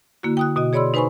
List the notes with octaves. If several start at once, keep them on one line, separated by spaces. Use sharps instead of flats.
D3 A#3 E4 F#4
G5 D#6 F#6
B2 F#4 D#5
G#4 C#5 D5 B5 C6 E6
D#4 B4 C5 G#5 B5 C#6